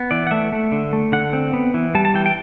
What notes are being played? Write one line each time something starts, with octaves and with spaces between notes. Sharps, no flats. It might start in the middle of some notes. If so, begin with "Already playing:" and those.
Already playing: B3
E3 D5
F#5
A3 E5
A3
D3
A3
D3 F#5
C4
B3
E3
G3 A5
A5
E3 G5
G5